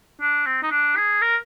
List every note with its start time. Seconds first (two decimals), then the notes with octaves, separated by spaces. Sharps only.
0.21 D4
0.46 C4
0.62 D#4
0.71 D4
0.97 G#4
1.22 A#4